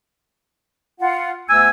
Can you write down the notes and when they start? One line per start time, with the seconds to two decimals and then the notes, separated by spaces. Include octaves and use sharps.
1.01 F4 F#5
1.49 D2 B3 G#5 E6